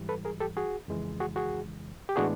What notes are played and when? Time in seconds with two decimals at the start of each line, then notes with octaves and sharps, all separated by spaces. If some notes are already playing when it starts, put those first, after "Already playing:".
Already playing: G#2 E3 G3
0.09 A4 B4
0.25 G#4 A#4
0.40 G4 A4
0.57 F#4 G#4
0.88 F2 C#3 E3 G#3
1.20 F#4 G#4
1.36 F#4 G#4
2.09 G4
2.16 A2 E3 G#3 B3 D4 F#4 G#4